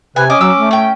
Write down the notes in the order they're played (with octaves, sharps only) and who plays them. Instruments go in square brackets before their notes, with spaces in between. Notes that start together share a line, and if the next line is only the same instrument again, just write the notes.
[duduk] C3 [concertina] B4 [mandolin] G#5
[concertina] C#4 D6 [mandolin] D#5 G#5
[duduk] F#3 [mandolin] E6
[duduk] A3
[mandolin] C#4 G5